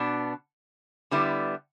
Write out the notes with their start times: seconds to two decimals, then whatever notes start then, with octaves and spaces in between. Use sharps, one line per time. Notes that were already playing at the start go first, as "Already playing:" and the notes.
Already playing: B2 B3 D4
1.11 D3 G3 B3 E4